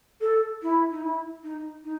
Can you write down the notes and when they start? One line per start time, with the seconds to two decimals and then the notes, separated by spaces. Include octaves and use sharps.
0.21 A4
0.62 E4
0.90 D#4
1.02 E4
1.43 D#4
1.84 D#4